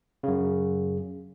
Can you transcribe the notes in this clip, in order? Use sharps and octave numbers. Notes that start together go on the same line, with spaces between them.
F#2 C#3